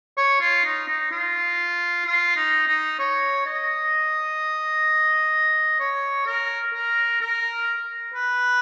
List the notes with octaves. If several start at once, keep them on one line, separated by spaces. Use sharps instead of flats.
C#5
F4
D#4
D#4
F4
F4
D#4
D#4
C#5
D#5
C#5
A#4
A#4
A#4
B4